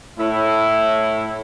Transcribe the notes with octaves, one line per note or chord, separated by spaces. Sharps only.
A2 E4